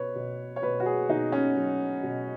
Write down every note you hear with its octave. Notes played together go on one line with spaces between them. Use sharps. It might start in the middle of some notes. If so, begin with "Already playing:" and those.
Already playing: B2 B4 C#5
B2
C#5
B2 B4
F#4
G#4
B2 D#4
C#4
F#3
B2